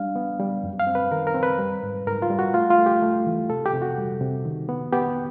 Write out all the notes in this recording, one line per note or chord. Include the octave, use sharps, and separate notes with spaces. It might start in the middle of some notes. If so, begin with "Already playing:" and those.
Already playing: G3 D4 F5
B3
G3
F#2
F5
C4
B4
D#3 A#4
A#4
C4
B4
G3
G#2
G#2 A#4
F4
G3
F#4
A3 F4
F4
A3
G4
A3
E3
C3 A4
G4
C3
F#4
G3
C3
D#3
B3
B3 G4